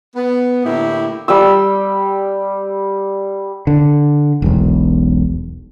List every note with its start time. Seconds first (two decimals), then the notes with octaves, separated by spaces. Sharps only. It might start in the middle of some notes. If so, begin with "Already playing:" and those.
0.16 B3
0.65 A2 D3 A#3 E4 G4
1.28 G3 G5 E6
3.67 D3
4.42 E1 B1